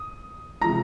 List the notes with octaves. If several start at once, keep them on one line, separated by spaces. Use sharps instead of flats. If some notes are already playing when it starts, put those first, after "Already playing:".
Already playing: D#6
C3 F3 G#3 A#5 A#6